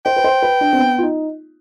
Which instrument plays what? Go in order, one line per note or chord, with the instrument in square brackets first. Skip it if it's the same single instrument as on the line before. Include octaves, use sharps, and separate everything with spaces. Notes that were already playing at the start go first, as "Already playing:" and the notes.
[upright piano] C5 [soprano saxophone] G5
[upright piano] B4
C5
B4
D4
C4
B3
F4
D#4